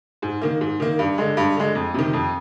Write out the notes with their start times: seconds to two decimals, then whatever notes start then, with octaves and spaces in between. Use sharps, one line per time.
0.22 G#2
0.41 D#3 A#3
0.61 G#2
0.80 D#3 A#3
0.99 G2
1.18 D3 G#3
1.37 G2
1.56 D3 G#3
1.75 F2
1.94 C3 D#3
2.13 F2